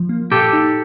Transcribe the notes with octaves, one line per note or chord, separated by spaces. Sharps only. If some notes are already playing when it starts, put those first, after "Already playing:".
Already playing: F3
A#3
A#2 G4 A4
D#4